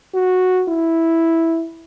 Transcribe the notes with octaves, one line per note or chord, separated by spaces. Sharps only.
F#4
E4